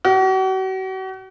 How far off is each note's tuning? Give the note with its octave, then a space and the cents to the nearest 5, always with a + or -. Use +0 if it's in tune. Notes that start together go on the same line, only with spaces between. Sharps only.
F#4 +40